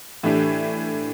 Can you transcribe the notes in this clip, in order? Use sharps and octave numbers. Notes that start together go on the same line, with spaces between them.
A2 E3 A3 D4 G4